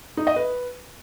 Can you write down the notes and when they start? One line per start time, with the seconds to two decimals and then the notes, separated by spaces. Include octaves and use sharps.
0.17 D#4
0.27 D#5
0.36 B4